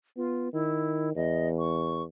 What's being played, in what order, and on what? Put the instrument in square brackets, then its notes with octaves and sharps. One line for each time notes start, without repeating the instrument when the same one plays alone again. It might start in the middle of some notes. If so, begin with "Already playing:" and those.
[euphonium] B3 [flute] F4
[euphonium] D#3 [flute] E4
[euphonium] E2 [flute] D#5
[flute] C#6